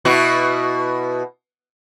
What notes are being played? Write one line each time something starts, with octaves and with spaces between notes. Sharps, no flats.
B2 E4 F#4